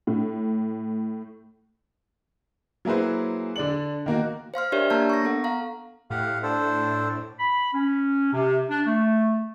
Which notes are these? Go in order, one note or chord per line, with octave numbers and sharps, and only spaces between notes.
A2
F#3 A#3 E4 G#4 B4 C5
D3 D5 F#7
D#3 A#3 F#4
C5 F5 C6 F6
D4 G4 A#4 C#5 D5 E5
A#3 D4 A#4 A5 A#5 G6
C#6 A#6
B3 A4 F#5
F5 A#5
A2 G4 F5 F#5
D4 A4 C5
B5
C#4
C3
D4
A3